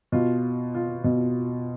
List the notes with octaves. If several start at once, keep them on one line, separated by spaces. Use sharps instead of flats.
B2 F4
F4
B2